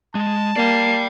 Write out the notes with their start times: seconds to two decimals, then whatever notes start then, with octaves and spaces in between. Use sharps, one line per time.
0.15 G#3 A5
0.56 A#3 D5 G5 C7